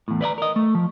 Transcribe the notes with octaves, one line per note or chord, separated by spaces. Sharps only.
E2 A2
B4 D5 D#5 A#5
A#4 D#5
A3
F3